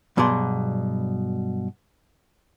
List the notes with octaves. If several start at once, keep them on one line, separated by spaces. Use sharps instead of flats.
G2 B2 F#3 G#4 D5 C6